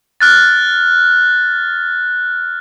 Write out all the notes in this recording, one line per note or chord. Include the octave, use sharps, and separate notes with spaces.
F6 F#6 A6